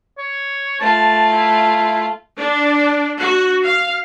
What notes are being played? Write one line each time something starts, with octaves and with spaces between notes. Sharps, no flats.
C#5
A3 F4 A5
E4
D4
F#4
F5